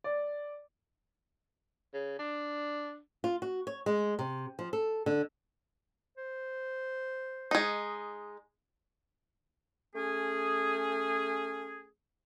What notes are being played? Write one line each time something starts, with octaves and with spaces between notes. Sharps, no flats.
D5
C#3
D4
F4
F#4
C#5
G#3
C3
F3
A4
D3
C5
G#3 D#4
A3 C#4 G#4